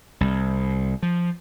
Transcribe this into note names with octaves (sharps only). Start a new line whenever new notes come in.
C2
F3